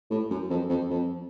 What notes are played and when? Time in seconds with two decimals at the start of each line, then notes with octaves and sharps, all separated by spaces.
0.11 A2
0.31 F#2
0.50 F2
0.70 F2
0.90 F2